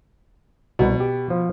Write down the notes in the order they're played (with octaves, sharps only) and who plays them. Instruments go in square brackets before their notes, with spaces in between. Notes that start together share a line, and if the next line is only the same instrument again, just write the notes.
[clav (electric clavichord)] C2 [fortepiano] B2
[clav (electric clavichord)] G4
F3